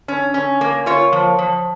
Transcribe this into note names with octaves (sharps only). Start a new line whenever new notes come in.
C#4
C#4
A#3
F4 C#5
F3
F3